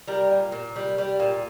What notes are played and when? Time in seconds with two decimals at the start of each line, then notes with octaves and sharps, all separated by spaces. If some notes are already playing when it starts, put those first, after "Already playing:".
0.07 G3 A#4
0.31 A#2
0.52 A#2
0.76 G3
0.98 G3
1.20 A#2